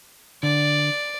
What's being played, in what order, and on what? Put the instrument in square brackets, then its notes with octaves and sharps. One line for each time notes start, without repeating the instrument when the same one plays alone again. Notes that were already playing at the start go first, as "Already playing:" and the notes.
[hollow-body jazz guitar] D3 [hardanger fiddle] D5